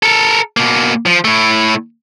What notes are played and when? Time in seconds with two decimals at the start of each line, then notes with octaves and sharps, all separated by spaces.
0.03 A4 A#4
0.57 B2 A#3
1.06 F3
1.25 A2 A3